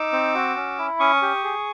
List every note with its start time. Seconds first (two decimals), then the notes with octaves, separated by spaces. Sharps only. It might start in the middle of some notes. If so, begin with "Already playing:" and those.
Already playing: D#4 D6 E6
0.12 C4
0.35 F#4
0.56 C#4
0.79 E4
0.99 C#4 C#6 D#6
1.22 G4
1.44 G#4